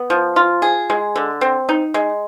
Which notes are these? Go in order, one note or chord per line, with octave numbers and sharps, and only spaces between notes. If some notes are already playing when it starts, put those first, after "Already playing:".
Already playing: B3
F3
F4
G#4
G#3
D3
C4
D#4
G#3